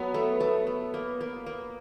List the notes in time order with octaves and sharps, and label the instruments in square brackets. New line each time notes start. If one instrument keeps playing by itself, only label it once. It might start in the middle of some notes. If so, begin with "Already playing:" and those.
Already playing: [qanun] F#3 [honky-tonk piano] B3
[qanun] A3
A3
A3
A#3
A#3
A#3